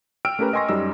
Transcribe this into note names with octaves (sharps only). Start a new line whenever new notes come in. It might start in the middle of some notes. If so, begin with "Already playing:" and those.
G5 E6 F6 D7
A3 C#4 G4 A#4 B4
D#5 G5 G#5 C6 C#6 A#6
F#2 G3 D#4 E6